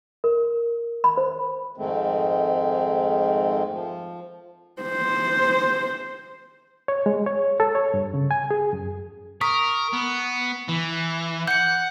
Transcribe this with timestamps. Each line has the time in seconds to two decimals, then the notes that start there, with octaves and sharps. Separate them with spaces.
0.24 A#4
1.04 B5
1.17 C5
1.78 F2 G#2 D#3 G#3 A3 C4
3.72 F3
4.82 C5
6.88 C#5
7.06 G#3
7.26 C#5
7.60 A4
7.75 C#5
7.94 G2
8.14 C#3
8.31 G#5
8.51 G#4
8.73 F#2
9.41 A#4 C#6 D#6 B6
9.93 B3
10.68 E3
11.48 F#5 G6 C#7